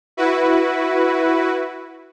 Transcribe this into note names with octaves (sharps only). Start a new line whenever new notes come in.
E4 F#4 B4